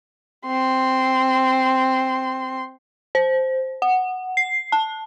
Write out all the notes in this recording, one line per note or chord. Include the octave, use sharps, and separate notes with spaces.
C4 C6
C5
F#5
C7
A5